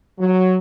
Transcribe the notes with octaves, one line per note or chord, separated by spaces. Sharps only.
F#3